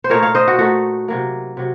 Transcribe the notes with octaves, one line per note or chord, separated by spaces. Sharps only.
C5
A#2 A3 D#4 A#4 C#5
C#5 F5
C5 D#5
F#4
A#2 A3 D#4 F#4
C3 F#3 A#3
C3 F#3